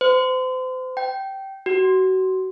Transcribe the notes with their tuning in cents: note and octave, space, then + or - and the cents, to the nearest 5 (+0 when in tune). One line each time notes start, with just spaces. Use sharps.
C5 -35
G5 -15
F#4 +30